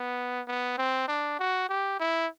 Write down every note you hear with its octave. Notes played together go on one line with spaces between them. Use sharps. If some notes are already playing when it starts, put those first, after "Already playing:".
Already playing: B3
B3
C4
D4
F#4
G4
E4